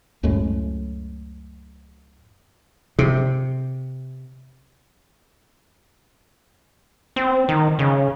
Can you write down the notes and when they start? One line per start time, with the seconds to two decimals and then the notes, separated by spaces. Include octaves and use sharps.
0.23 C#2 F#2 A2 G#3
2.99 C3
7.16 C4
7.49 D#3
7.79 C#3